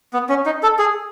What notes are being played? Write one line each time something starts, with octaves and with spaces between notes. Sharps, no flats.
B3
C#4
D#4
A4
G#4